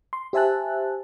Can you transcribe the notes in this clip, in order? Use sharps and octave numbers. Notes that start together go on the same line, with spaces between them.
C6
G4 C5 E5 G#5 A5 F#6